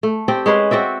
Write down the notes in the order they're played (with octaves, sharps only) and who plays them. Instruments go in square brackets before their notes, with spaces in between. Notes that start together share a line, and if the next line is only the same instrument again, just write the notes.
[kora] A3
C4 G4 D5
G#3 C#4 B4 C5
C4 F#4 D5 E5